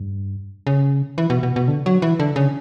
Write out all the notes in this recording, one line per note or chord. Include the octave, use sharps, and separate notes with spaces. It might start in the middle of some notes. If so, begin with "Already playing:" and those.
Already playing: G2
C#3
E3
B2
B2
B2
D3
F#3
E3
D3
C#3